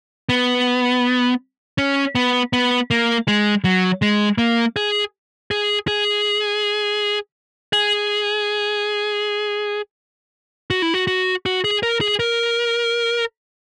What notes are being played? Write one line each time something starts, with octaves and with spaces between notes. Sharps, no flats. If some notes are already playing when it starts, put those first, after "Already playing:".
B3
C#4
B3
B3
A#3
G#3
F#3
G#3
A#3
G#4
G#4
G#4
G#4
F#4
E4
F#4
F#4
F#4
G#4
A#4
G#4
A#4